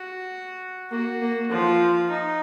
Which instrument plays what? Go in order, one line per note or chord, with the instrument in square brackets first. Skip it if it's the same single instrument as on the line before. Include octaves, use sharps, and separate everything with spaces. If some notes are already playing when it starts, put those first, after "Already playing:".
Already playing: [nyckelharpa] F#4
[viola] A#3 [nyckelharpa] F#4
[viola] A#3
[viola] F3 [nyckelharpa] F4
[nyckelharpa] D#4